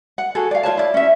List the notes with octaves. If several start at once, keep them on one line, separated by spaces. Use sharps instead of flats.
F#5
F#4 G#4 A4
D5 F5
F4 B4 C#5 A5
E4 D5
C#4 E5